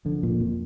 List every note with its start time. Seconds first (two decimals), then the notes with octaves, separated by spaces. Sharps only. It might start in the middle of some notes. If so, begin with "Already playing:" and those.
0.05 D3 F3
0.23 A#2
0.31 A#3
0.40 F2